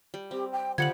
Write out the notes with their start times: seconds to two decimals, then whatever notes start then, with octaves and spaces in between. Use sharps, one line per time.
0.14 G3
0.31 C4 G4
0.52 G5
0.78 D3 F3 G3 G4 F#5 G#6 C#7 F#7